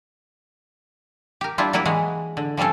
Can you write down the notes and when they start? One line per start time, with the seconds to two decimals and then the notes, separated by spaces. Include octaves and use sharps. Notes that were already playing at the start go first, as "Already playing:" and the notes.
1.41 G4 A#4
1.58 G3 D4 E4 F4
1.73 F#3 G3 A#3 E4 B4
1.85 E3 G#3 F#4
2.37 D3
2.57 F3 G3 C4 C#4 A4